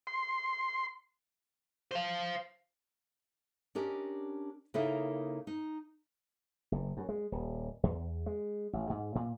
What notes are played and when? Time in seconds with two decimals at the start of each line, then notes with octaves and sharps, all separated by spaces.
0.07 C6
1.91 C5 F5
3.75 C#4 D4 G4 A#4 D#5
4.74 C#3 A#3 D#4 E4 A4 A#4
5.47 D#4
6.72 F#1
6.97 F#2
7.09 G#3
7.32 D#1
7.83 E2
8.26 G#3
8.73 A1
8.90 G#2
9.15 A#2